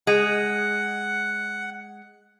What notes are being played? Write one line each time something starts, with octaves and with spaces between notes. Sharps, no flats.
G#3 F#5